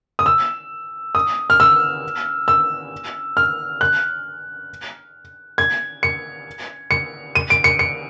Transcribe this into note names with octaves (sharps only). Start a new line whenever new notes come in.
D#6
E6
D#6
F6
E6
E6
F6
F#6
G#6
C#7
C#7
D#7
D7
C#7
C#7